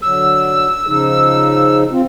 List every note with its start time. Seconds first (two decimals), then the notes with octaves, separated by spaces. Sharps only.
0.02 D3 F#3 E6
0.87 C#3 F3 D#4
1.91 C4 F4